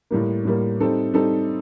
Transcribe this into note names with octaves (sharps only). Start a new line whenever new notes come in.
A2 G3 A#3
A2 G3 A#3
G3 C4 D#4 A4
G3 C4 D#4 A4